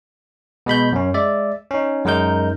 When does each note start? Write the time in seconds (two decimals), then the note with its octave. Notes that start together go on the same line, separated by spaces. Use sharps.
0.66 B2 G#3 B5 G6
0.93 F#2 C#4
1.14 G#3 D5 E5
1.71 C#4 D#4
2.05 F#2 G#3 D#4 A#4 G6